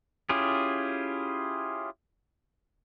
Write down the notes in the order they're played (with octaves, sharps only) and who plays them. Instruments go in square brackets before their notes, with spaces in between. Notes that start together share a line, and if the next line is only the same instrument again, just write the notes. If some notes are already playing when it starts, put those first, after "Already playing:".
[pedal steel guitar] C#4 E4 F4 G4 G#4